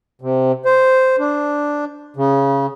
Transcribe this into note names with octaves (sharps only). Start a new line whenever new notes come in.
C3
C5
D4
C#3